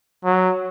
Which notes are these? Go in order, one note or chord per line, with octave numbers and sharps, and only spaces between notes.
F#3